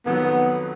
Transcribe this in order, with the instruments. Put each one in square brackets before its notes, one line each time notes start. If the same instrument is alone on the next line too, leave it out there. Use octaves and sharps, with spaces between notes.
[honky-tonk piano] F2 D#3 F#3 [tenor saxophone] B3